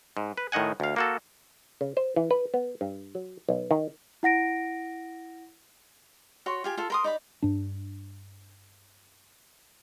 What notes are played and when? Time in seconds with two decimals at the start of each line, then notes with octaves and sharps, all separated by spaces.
0.17 G#2
0.37 B4
0.52 A2 D#3 D#5 F#5 G#5
0.80 D2 F5
0.96 A#3 F#4 A4
1.81 C#3
1.97 C5
2.16 E3
2.31 B4
2.54 B3
2.81 G2
3.15 F#3
3.49 B1
3.71 D#3
4.23 E4 F#5 A#6 D7
6.46 F#4 C#5 C6
6.64 F4 G4 G#5
6.77 F4 A4
6.90 A#4 C6 D#6
7.04 D#4 D5 B5
7.42 G2 D4